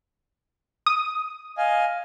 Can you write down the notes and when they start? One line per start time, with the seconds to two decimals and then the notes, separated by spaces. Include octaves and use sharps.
0.86 D#6
1.58 D#5 F5 G#5